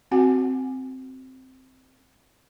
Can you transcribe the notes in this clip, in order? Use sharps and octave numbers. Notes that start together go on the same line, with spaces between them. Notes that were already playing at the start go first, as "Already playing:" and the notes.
C4 F#4 F#5 G#5